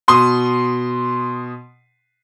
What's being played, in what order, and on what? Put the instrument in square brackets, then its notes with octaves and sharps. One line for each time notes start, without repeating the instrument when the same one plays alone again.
[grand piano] B2 C6 D#6